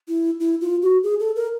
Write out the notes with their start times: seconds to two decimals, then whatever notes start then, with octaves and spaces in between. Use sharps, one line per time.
0.08 E4
0.40 E4
0.61 F4
0.82 F#4
1.04 G#4
1.20 A4
1.36 A#4